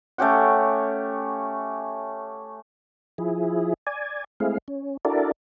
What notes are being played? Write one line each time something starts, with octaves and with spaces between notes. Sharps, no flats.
A3 C#4 G4 F#5
F3 E4 G#4
D5 G#5
G#3 A3 C4 E4 G#4 F5
C#4
D4 E4 F#4 A4 A#4 D5